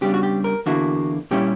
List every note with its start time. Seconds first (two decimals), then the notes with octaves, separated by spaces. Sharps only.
0.01 C#3 G3 B3 D4 G4
0.14 F#4
0.23 G4
0.44 A#4
0.66 E2 D3 A#3 E4 F#4
1.31 A#2 G3 C#4 E4 G4